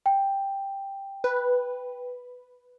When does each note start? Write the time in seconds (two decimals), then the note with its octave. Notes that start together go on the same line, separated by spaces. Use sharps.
0.06 G5
1.24 B4